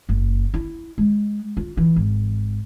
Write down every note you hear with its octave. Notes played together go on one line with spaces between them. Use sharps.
F#1
E4
G#3
F4
E3
G#1